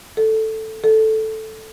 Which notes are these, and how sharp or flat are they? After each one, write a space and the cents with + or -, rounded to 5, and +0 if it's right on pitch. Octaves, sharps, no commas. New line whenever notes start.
A4 +0
A4 -5